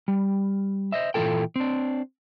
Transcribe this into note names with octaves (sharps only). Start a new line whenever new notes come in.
G3
C5 D#5 E5
A#2 E3 G#3 F4 A4 G5
C4 D4